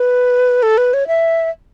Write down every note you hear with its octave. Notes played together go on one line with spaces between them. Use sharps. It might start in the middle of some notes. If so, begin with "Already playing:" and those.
Already playing: B4
A4
B4
C#5
E5